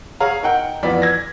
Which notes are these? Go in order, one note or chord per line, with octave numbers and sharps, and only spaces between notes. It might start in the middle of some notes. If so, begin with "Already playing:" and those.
G#4 C#5 F5 A#5
D#4 A#4 F#5 G5
F2 E3 B3 D5 B6
G#6 A#6